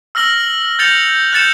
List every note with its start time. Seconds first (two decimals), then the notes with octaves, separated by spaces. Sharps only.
0.15 E6 F6 A#6 F#7 G7
0.79 G6 A6 C#7 F7 G7
1.32 F#6 G6 A6 C#7 E7